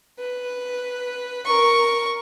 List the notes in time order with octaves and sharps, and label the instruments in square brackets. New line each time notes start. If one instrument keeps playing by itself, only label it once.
[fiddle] B4
A#4 C#6